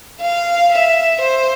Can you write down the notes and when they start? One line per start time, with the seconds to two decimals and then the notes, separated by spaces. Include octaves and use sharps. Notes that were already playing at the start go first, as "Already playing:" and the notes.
0.21 F5
0.72 E5
1.21 C5